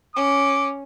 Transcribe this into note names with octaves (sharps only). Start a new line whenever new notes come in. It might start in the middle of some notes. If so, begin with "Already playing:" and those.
C#4 D6